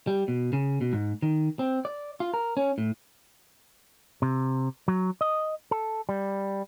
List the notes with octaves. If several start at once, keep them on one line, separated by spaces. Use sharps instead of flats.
G3
B2
C#3
B2
G#2
D#3
C4
D5
F4
A#4
C#4
A2
C3
F#3
D#5
A4
G3